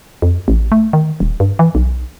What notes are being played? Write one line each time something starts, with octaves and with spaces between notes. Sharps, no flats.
F2
A1
A3
D#3
D#1
G2
E3
B1